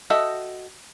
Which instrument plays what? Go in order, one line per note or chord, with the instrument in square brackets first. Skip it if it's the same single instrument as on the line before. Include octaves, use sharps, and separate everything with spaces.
[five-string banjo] F#4 A4 D#5 E5 G5